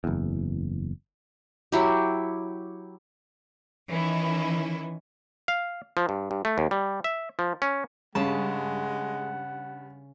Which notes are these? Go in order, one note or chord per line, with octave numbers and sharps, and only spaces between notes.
F#1 E2
F#3 E4 G4
D#3 E3 C#4 E4
F5
F3
G2
G2
A3
D#2
G3
E5
F3
C#4
G2 C#3 G#3 F#5 A5